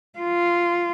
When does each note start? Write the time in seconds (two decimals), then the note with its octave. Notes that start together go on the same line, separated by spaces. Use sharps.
0.19 F4